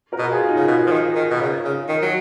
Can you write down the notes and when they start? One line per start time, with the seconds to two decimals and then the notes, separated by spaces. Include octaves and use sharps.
0.12 F#4 A#4
0.19 B2
0.31 F4 G#4
0.43 F4
0.49 D#4 F#4
0.56 C#3
0.68 B2
0.87 F3
0.91 D#3
1.15 D#3
1.31 B2
1.41 C#3
1.65 C#3
1.89 D#3
2.02 F#3